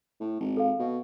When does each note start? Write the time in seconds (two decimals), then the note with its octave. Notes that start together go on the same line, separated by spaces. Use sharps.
0.20 A2
0.40 G#1
0.57 A4 F5
0.79 B2